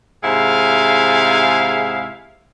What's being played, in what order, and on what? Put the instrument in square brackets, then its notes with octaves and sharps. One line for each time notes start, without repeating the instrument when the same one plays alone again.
[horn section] G#2 C3 E4 G#4 F5